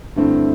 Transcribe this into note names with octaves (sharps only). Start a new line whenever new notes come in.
G2 D3 A3 C4 E4